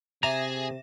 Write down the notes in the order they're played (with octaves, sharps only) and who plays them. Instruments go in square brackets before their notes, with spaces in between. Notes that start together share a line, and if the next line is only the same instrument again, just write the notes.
[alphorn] C3 [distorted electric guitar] G#4 [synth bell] E5 A#6 E7 [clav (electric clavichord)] A#5